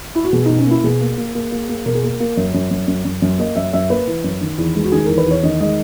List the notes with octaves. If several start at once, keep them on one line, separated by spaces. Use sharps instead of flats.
E4
F#4
B2 G#4
B2 D#4
C#4
A#3 E4
B2 G#4
A#3
A#3
A#3
A#3
A#3
B2 A#4
G#4
A#3 A#4
A#3
F#2
F#2
F#2
F#2
F#2
F#2
A#3 D#5
F#2 E5
F#2 E5
A#3 B4
E3
F#2
D#3
E2
G#3
F#4
D#3 G#4
E2 A#4
B4
E2 C#5
D#3 D#5
G#3 D#5